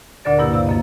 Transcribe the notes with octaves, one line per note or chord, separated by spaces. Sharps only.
D2 A#2 D3 A#4 D5 A6
G2 B2 A#3 E4 G4
C3 F5
F#2 A#3 D#5